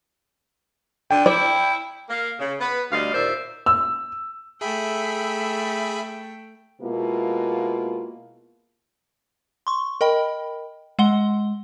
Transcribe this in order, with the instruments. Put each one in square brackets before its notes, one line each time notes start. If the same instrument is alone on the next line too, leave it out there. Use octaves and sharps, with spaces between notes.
[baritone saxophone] D3 [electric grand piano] G5
[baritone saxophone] E4 [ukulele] D5
[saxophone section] A#3 F5
C#3
B3 B4
D2 G3 D#5 F5
D#2 A#2 C5 D5 E5
[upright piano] E6
[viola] A3 G5 [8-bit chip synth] G#4 E5 B5
[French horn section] B2 G#3 A#3 E4 F4
[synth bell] C6 C#6
A#4 D#5 G5 B5
G#3 F#5 G7